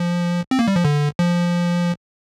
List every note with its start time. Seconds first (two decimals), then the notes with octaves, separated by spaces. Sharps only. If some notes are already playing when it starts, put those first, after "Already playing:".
Already playing: F3
0.51 C4
0.59 A#3
0.68 G3
0.76 F3
0.85 D3
1.19 F3